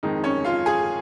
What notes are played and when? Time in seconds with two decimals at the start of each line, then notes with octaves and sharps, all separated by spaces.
0.03 F2 D#3 G#3 D#4
0.24 C#4 C#5
0.45 F4 F5
0.66 G#4 G#5